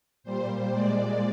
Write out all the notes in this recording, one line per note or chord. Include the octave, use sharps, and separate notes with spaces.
A#2 G3 C5
A#2 G#3 D5